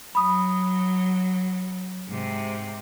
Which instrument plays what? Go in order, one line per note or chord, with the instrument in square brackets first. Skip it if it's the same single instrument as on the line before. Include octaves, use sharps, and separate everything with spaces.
[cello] F#3 [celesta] B5 D#6
[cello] G#2 C3